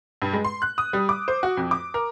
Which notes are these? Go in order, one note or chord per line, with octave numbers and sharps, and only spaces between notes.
G2
G#3
C6
F#6
D#6
G3
D6
C5
F#4
F2
D6
A#4